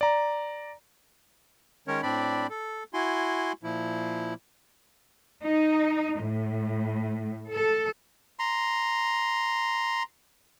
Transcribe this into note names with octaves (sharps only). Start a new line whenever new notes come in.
D5 A#5
D#3 G#3 C#4 A#4 C#5
A2 C4 D4 D5 B5
A4
E4 F#4 G#5 C6
A#2 F3 E4
D#4
A2
A4
A#5 C6